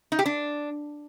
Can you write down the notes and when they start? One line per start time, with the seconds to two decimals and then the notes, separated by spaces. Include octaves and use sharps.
0.12 D#4
0.19 G4
0.26 D4